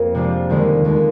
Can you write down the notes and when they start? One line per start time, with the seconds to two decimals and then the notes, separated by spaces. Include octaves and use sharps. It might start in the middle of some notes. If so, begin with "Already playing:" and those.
Already playing: F2 A#3
0.15 C3 F3 G#3 D4 F4
0.50 D#2 D3 G#3
0.85 D#2 D3 G#3